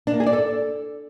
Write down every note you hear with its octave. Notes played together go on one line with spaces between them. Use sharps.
D4
A#3
G#4
D5
A4